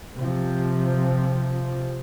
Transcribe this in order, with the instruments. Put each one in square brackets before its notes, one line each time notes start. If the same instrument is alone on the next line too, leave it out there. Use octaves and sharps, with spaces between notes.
[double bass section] C3 F3